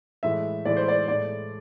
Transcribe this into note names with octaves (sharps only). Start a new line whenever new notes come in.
A2 E3 G#3 E5
A2 E3 G#3 D5
C5
D5
A2 G#3 D5